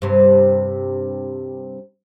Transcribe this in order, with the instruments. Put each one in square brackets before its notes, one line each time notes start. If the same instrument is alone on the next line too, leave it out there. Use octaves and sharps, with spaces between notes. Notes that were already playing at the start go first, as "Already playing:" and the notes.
[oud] G2 C3